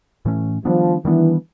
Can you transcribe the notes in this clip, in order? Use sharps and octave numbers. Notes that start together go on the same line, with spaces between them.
A2 E3 A3 C#4
D#3 F3 G3 B3 D4
D#3 E3 G3 B3 D4